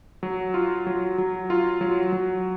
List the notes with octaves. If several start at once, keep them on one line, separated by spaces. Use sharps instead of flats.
F#3
F4
F#3
F#3
F4
F#3
F#3